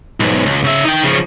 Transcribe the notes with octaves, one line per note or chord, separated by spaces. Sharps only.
B1 G#2
C#2
C#3 E5
D#4 G5
C#3 F3